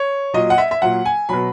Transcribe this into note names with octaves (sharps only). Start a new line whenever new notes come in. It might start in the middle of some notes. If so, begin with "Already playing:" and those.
Already playing: C#5
A#2 F#3 D#5
F#5
E5
E5
A#2 F#3 F#5
G#5
B2 F#3 B5